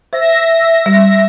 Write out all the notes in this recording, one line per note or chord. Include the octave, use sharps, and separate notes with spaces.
C5 E5 A#6
G3